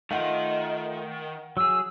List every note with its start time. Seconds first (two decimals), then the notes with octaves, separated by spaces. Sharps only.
0.11 D#3 A3 F4 F5 F#5
1.57 F#3 G#4 E6